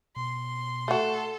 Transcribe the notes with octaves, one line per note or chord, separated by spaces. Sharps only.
B2 C6
A3 F#4 A4